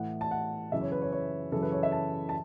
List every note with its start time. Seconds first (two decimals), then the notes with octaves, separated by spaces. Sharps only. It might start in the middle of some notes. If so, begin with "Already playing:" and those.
Already playing: A2 E3 F#5
0.21 A5
0.31 F#5
0.72 F#2 C#3 E3 E5
0.81 C#5
0.92 B4
1.02 C#5
1.12 C#5
1.52 F#2 C#3 E3 A4
1.62 B4
1.72 C#5
1.83 E5
1.92 A5
2.29 A5